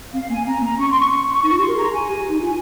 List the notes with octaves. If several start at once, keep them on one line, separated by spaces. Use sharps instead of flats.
C4 F5
A#3 G#5
C4 A#5
C4
A#3 A#5
C#4 C#6
C6
C#6
C#6
C#6
D#4 C#6
F4
G4 C6
A#4
G#4 A#5
G#5
G4
D#4
F4